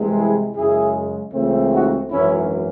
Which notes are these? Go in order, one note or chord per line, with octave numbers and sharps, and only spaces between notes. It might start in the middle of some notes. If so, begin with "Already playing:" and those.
Already playing: C2 C3 E3 G#3
E4 G#4
F#2 C#3 G#3 E4 G#4
C#2 C#3 E3 A3 C4
D#4 F#4
G#1 F#2 E3 C#4 E4